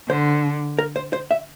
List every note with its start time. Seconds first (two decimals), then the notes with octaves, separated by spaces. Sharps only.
0.09 D3 C5
0.79 A#4
0.96 C5
1.13 C5
1.31 E5